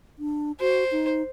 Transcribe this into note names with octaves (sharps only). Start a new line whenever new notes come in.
D4
F#4 C5
D#4